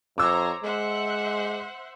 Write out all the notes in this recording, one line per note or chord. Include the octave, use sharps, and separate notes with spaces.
F2 C5 C#5 A#5 D6 E6
G#3 C5 E5 F#5